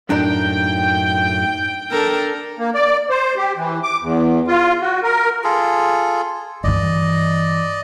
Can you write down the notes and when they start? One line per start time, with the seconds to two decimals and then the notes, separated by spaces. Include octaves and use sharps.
0.10 F#2 A2 D4 D#4 A#4 G5
1.91 D4 A4 A#4
2.59 A#3
2.74 D5
3.10 C5
3.37 G4
3.57 E3
3.83 D6
4.01 E2
4.47 F4
4.82 F#4
5.03 A#4
5.44 F4 G#4 A4
6.64 G2 E3 D5 D#5